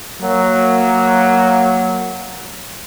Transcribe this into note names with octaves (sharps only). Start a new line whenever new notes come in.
F#3 A#3